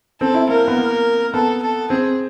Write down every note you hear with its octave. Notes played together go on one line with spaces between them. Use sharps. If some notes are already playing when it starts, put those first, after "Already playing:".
C4 A4
E4
A#3 A#4
B3
A#3
B3 A4
A4
C4 G#4